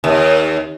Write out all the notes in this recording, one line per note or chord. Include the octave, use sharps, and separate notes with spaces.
D#2